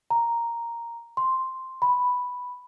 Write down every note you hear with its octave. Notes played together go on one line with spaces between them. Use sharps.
A#5
C6
B5